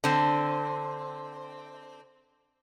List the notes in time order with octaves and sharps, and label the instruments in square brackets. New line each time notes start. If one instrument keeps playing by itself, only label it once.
[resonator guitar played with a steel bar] D3 C4